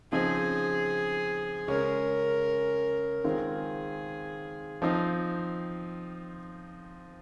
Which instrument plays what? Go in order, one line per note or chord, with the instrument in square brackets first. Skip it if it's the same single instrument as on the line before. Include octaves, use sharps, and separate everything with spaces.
[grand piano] C#3 F3 C4 D#4 [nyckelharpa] G#4
[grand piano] C#3 G#3 C#4 [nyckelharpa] A#4
[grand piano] D#3 G#3 C4 F4 [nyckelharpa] G#4
[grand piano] F3 C4 D#4